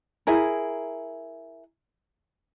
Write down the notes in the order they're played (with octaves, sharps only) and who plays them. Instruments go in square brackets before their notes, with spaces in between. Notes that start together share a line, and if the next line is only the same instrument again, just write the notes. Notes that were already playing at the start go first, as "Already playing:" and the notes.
[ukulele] E4 G#4 A#4